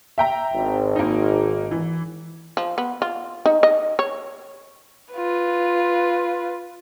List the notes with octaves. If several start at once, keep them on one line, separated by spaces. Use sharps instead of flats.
E5 G5 A#5
G#1
A#3 D#4
E3
F3
B3
F4
D#4
D#5
C#5
F4 B4